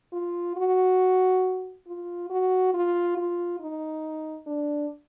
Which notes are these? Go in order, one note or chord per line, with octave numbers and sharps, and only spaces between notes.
F4
F#4
F4
F#4
F4
F4
D#4
D4